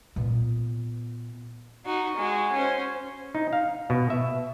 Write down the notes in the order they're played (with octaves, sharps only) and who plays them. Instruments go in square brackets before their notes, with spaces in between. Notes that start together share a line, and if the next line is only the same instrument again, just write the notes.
[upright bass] A#2 B3
[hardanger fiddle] D#4 F#4
G#3 F#4
C#4 C5
[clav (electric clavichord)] D#4
F5
B2
E5